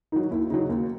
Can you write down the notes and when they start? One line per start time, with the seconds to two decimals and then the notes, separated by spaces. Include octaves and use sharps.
0.12 D#3 F#3 D#4
0.31 D#2 E4
0.50 C#3 F#3 D#4
0.69 D#2